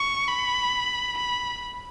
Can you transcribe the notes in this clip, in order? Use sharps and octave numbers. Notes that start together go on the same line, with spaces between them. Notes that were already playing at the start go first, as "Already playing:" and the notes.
Already playing: C#6
B5
B5